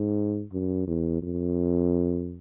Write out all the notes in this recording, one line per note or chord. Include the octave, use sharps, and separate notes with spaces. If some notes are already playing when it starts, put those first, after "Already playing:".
Already playing: G#2
F#2
E2
F2